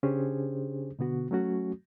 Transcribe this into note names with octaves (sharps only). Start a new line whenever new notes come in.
C#3 C#4 D4 G4 G#4 C5
B2 D3 B3 F#4
F#3 A3 C#4 F#4